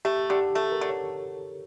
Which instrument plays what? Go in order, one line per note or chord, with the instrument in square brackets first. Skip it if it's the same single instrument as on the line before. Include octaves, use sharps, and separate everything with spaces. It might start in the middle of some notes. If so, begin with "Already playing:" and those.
[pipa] A3 [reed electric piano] G4
[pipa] D3 [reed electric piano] G4
[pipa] A3 [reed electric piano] A4
[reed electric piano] A#4
[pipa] D3
[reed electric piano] C#5